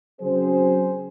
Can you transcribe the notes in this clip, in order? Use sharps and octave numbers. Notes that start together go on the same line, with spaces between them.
C#3 F#3 C4 G#4 C5